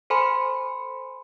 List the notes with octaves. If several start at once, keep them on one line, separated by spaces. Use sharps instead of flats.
A4 C5 G#5 B5 C6 C#7